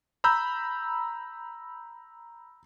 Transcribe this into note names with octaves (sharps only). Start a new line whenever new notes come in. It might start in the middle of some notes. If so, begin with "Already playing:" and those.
A#5 B5 E6 G6